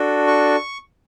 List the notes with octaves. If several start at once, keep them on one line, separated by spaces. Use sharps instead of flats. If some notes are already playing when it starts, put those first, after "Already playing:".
Already playing: D4 F#4 A4
C#6